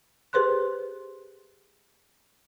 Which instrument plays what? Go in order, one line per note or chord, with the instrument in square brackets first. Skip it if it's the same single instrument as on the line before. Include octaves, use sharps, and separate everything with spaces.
[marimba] G4 G#4 B4 C5 C6 F#6